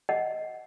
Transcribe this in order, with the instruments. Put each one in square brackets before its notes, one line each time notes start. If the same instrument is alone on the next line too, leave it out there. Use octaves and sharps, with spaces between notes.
[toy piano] D#5 F#5